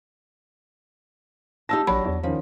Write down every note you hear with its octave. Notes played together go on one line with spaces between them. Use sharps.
D#4 F4 G4 A5 E6 A#6
A#1 F#3 D4 B5
E2
D#3 F3 C#4